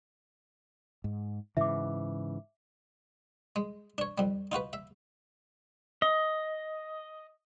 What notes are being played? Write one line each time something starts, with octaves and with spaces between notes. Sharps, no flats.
G#2
G#2 C#3 E3 E5 D6
G#3
D4 C#5
F2 G3
D#4 F4 F#4 B4
E5
D#5